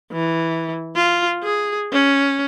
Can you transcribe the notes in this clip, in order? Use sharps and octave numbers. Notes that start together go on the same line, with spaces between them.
E3
F4
G#4
C#4